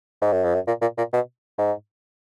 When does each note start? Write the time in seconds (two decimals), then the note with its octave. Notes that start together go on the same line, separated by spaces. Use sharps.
0.22 G#2
0.32 F#2
0.44 F2
0.55 F#2
0.67 A#2
0.81 A#2
0.98 A#2
1.13 B2
1.58 G#2